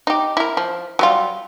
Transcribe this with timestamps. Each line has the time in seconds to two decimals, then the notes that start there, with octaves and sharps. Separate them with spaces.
0.07 D#4 G4
0.37 E4 A#4
0.57 F3
0.99 F#3 G3 F4